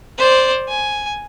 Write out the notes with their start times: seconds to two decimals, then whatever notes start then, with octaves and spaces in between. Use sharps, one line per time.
0.18 C5 D5
0.68 G#5